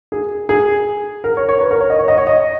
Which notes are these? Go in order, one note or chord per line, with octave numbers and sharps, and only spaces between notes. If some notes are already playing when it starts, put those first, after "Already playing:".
G#4
G#4
A#4
C#5
C#5
B4
A#4
C#5
D#5
C#5
D#5
C#5
D#5